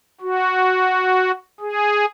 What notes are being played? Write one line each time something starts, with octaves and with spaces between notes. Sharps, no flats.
F#4
G#4